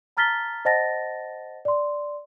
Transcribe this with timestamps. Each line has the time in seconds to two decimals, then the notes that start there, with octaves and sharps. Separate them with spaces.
0.17 A5 A#5 F6 A6 B6 G7
0.65 C5 D#5 F#5 A5 A6 A#6
1.65 D5 C6